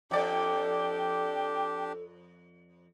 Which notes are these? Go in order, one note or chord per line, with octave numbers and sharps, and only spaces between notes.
F2 D4 G4 A4 D5 G5